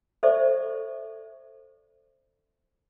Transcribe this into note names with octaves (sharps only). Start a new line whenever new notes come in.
A4 C5 D5 E5 C#6